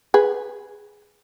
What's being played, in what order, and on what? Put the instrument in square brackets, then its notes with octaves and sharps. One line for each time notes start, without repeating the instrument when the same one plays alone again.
[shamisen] G#4 B4